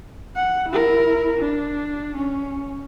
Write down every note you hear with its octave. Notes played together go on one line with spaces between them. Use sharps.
F#5
E4 A#4
D4
C#4